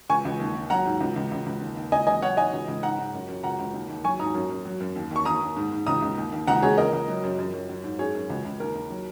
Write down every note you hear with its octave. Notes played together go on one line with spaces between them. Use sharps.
C#2 G#5 C#6
C#2
D#2
D#2
F#3 F#5 A#5
G#2
C#2
C#2
C#2
C#2
D#2
D#2
C#2 D#5 G#5
C#2 D#5 G#5
F#3 C#5 F#5
G#2 D#5 G#5
C#2
C#2
G#2 F#5 A#5
G#2
F#2
F#2
C#2 F#5 A#5
C#2
D#2
D#2
F#3 G#5 C#6
G#2 A#5 D#6
F#2
F#2
F#3
F#2
D#2
D#2 C#6
D#2 A#5 D#6
D#2
G#2
G#2
C#2 A#5 D#6
C#2
D#2
D#2
C#2 F#5 A#5
C#2 G#4 C#5
C#2 A#4 D#5
C#2
F#3
F#2
F#2
F#2
F#3
G#2
F#2 G#4 C#5
F#2
C#2
C#2
D#2 A#4
D#2
F#3